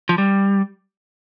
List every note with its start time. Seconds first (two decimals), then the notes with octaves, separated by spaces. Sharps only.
0.09 F3
0.18 G3